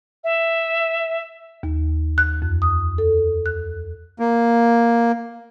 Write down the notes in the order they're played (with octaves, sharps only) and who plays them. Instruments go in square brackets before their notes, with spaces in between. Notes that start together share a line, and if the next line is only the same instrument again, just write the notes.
[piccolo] E5
[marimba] D#2
F#6
F2
D#6
A4
F#6
[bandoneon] A#3